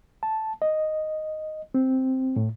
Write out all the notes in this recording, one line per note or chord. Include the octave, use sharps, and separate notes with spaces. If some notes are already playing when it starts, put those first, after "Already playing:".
A5
D#5
C4
A2